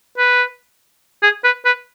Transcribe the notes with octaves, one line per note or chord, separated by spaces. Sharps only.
B4
G#4
B4
B4